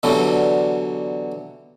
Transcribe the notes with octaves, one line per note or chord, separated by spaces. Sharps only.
B2 D3 E3 F#3 G3